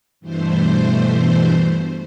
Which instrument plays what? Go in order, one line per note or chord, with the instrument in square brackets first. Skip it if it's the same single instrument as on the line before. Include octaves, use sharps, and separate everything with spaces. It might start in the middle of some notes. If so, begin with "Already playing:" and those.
[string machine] G2 B2 E3 A3 C5